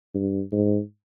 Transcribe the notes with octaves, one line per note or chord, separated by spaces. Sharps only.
G2
G#2